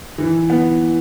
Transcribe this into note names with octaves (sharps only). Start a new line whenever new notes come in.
E3
B3